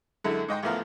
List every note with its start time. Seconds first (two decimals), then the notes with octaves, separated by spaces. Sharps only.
0.24 F#2 D3 G#3 E4
0.48 G#2 D#5 G5 C6
0.63 A1 D2 F3 B3 A#4 F5